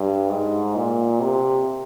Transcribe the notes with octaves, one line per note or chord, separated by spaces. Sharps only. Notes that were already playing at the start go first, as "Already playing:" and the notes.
Already playing: G2
G#2
A#2
C3